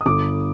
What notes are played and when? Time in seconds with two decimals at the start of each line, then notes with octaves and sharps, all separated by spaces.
0.01 D#6
0.06 G1 D6